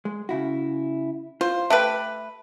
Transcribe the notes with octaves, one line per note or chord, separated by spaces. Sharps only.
G#3
C#3 E4 F#4
F4 C5
A3 G4 B4 E5